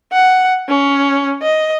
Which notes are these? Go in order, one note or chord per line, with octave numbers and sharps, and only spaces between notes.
F#5
C#4
D#5